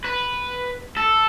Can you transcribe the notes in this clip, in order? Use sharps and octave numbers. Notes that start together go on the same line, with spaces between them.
B4
A4